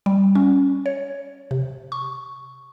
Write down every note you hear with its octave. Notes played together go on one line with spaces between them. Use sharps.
G3
C#4
C#5
C3
C#6